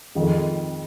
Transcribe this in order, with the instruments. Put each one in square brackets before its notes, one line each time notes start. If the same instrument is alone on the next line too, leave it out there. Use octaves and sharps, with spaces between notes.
[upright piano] F2 D#3 G#3 D#4